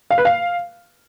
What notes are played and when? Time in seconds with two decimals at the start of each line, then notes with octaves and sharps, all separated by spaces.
0.11 F5
0.18 B4
0.25 F5